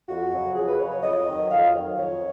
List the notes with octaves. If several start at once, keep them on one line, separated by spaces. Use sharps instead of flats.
F2 F#4
C#3 F#3
F2 G#4
B4
C#3 F#3 C#5
C#5
F2 D#5
D#3 F#3
F2 F5
D#3 F#3
F2 C#5